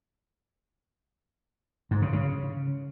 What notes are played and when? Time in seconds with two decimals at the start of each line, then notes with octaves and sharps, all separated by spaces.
1.91 G#2
2.02 C#3
2.13 C#3